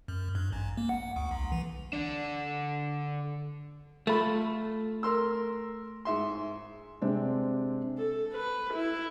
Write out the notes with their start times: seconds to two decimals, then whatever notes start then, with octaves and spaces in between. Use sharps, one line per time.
0.08 F#2
0.35 G2
0.52 A1
0.77 A#3
0.89 F#5
1.16 D2
1.31 B1
1.52 E3
1.93 D3 D4
4.07 A3 F4 B5
5.03 A#4 C6 E6
6.05 G#2 E5 C6
7.02 C3 G#3 C4 D4
7.98 A4
8.33 B4
8.74 E4